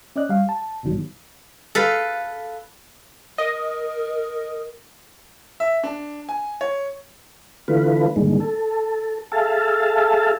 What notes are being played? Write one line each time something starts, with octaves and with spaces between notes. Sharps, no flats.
C#4 D5 D#5 F#6
G3 F5
A5
A1 G2 B2 D#3 F#3 G3
A4 B4 F5
A#4 D#5
E5
D4
G#5
C#5
D3 E3 A3 F4 B4
G2 A#2 D3 D#3 G#3
A4
G#4 A4 E5 F5 A5